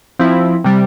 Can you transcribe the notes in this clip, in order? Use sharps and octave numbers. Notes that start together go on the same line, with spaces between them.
F3 C4 E4
C3 G3